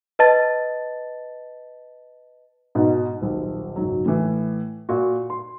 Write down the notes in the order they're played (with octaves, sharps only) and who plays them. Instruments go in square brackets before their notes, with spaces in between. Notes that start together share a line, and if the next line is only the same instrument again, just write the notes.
[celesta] B4 D#5 A5 A6
[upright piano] G#2 B2 D#4
D#1 B1
F#1 B1 G#2 F#3
A2 E3
A#2 F#4
C6